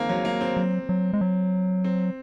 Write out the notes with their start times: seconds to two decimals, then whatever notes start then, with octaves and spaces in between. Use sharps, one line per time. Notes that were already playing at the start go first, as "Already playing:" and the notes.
Already playing: D#3 F3 G#3 A#3 C4
0.09 F#3
0.25 A#3
0.41 C4
0.57 F#3
0.89 F#3
1.13 G#3
1.21 F#3
1.84 C4